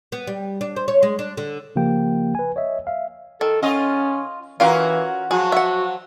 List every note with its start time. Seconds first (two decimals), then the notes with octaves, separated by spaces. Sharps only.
0.12 B3
0.27 G3
0.61 D4
0.76 C5
0.88 C#5
1.03 G#3
1.19 D4
1.37 D3
1.76 C#3 F3 A#3 G4 G5
2.35 B4 G#5
2.56 C#5 D#5 E5
2.87 E5 F5
3.41 D#3 A4
3.62 C#4 F4 D#5
4.60 E3 C#4 F4 F#4 A#4 F5 G5
5.31 F3 F#3 F#4 G#4
5.52 E5 F#5